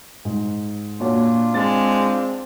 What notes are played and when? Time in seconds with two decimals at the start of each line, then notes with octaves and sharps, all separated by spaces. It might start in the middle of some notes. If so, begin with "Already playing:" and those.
0.25 G#2
1.00 A#2 D4 F4 F#4 C#5
1.54 G#3 C4 A6